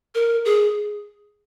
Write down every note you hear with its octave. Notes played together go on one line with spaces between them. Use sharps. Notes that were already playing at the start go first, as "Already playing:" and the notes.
A#4
G#4